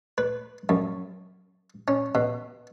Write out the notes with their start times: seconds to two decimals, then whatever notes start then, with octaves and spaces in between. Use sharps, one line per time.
0.18 B4
0.69 F#2
1.88 C#4
2.15 B2